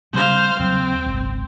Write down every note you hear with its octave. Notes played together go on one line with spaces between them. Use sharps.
C#3 G3 C4 C5 F5
D#2 C#3 F#3 C4
D#1 G#1 C#2